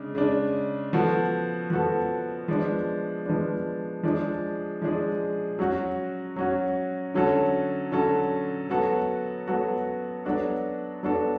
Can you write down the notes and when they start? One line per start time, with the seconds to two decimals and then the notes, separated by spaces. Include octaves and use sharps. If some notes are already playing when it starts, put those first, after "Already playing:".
Already playing: C#3 G#3 D4
0.15 C#3 G#3 D4
0.93 F3 B3 F#4 A4
1.70 F3 B3 F#4 A4
2.48 F3 G#3 B3 D4
3.26 F3 G#3 B3 D4
4.03 F3 G#3 D4 G#4
4.82 F3 G#3 D4 G#4
5.59 F#3 C#4 F#4
6.36 F#3 C#4 F#4
7.14 D3 F#3 C#4 F#4 A4
7.92 D3 F#3 C#4 F#4 A4
8.70 F#3 B3 F#4 A4
9.48 F#3 B3 F#4 A4
10.25 F#3 B3 D4 F#4 A4
11.03 F#3 B3 D4 F#4 A4